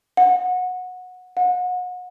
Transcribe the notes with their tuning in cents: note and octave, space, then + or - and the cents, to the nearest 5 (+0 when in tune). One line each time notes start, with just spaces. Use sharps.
F#5 -20
F#5 -35